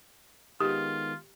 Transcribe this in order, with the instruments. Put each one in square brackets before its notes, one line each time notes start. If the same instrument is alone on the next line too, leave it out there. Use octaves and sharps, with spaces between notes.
[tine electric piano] D#3 G#3 B3 [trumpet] F4 [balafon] G4